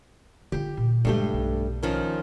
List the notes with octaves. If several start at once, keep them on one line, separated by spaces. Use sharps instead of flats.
D3 F4 G4
A#2
G2 C#3 G#3 A3 G4
B1
D#3 F3 C#4